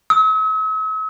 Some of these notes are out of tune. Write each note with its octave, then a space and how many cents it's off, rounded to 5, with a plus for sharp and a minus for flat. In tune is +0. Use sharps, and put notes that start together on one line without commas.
E6 -45